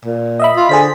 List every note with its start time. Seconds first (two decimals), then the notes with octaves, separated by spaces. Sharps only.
0.05 A#2
0.40 D#5 E5 B5
0.56 F4
0.69 D3 G#4 C5 B6